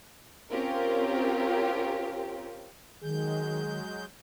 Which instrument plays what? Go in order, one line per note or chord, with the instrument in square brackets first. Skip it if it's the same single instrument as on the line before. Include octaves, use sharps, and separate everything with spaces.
[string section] C4 C#4 F4 G4 A#4
[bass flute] D#3 [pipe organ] F#3 G#3 G6 [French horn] G#4